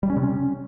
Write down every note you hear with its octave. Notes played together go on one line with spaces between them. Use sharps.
G3
C#4
C3
C#4